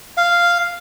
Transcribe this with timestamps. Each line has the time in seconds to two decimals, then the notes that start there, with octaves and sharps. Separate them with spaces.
0.17 F5